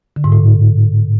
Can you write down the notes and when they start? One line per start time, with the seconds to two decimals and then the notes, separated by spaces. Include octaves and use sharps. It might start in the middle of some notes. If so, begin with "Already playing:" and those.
0.16 D3
0.24 G#2
0.32 A2